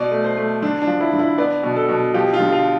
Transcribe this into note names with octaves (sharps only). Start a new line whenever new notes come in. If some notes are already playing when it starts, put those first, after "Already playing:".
Already playing: B2 D5
A3
C5
A3
D3 D4
D4
F3
E4
D3
E4
B3 D5
B2
A4
B2
F3 G4
F4
D3
F4